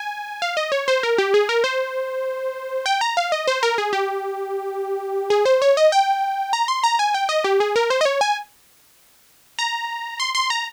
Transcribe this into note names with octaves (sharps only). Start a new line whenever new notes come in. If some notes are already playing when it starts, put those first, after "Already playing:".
Already playing: G#5
F5
D#5
C#5
C5
A#4
G4
G#4
A#4
C5
G5
A#5
F5
D#5
C5
A#4
G#4
G4
G#4
C5
C#5
D#5
G5
A#5
C6
A#5
G#5
G5
D#5
G4
G#4
A#4
C5
D#5
C#5
G#5
A#5
C6
C6
A#5